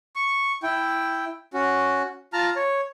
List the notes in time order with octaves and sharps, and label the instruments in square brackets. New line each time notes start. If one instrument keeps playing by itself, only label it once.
[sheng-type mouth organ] C#6
E4 G5
C#4 F#4
F4 A5 A#5 F6
C#5